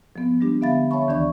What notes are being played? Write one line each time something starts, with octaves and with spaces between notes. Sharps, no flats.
F3 B3 C4
G3 G#3 C4 D4 G4
D3 B3 E5 F5 B5 A6
C#5 E5 G5 A5 B5 C#6
D2 D#3 E3 D4 D5 C#6